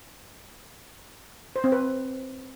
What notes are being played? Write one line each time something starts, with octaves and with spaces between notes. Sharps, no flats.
C5
C4
B4